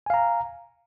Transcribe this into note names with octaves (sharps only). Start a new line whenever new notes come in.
F5 G#5 A#5